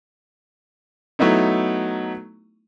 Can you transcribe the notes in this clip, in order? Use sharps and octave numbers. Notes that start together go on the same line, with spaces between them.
F#3 A3 B3 D#4 E4